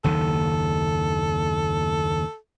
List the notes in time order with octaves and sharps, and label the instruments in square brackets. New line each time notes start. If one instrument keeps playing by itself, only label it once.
[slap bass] F#1 D#2 D#3 [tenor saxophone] A4